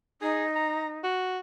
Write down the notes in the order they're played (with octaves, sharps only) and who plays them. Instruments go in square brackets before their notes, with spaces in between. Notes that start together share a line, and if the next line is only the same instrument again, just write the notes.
[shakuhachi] D#4 [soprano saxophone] G#4
[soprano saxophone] A#5
F#4